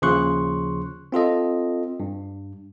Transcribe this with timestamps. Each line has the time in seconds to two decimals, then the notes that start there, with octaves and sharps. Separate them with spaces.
0.02 D#2 C#3 F3 C6 C#6 F#6
1.12 C4 F4 A4 D#5
2.00 G2